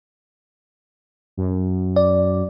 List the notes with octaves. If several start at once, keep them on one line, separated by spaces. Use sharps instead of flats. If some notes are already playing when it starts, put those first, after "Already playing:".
F#2
D5